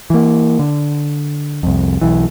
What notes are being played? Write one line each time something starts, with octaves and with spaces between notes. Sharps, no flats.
E3 A#3
D3
C2 F2
B1 E3